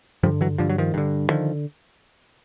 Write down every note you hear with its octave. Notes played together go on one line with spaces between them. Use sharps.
G2 D3 F3 G3
E3 F#3
G2 D3 F3
F#3
D#3 F3
G2 D3
D3 D#3 F3